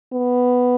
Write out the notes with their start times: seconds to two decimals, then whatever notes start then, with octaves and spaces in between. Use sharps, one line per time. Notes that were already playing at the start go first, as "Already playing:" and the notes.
0.13 B3